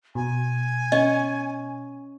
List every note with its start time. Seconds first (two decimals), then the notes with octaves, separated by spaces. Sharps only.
0.15 B2 G#5
0.92 C#4 D#5